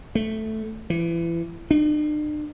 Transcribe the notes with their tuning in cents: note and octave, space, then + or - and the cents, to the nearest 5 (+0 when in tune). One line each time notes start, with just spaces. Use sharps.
A3 -5
E3 +30
D4 +45